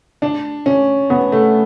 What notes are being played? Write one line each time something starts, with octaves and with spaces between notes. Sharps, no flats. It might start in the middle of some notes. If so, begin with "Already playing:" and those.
D4
C#4
B3
A3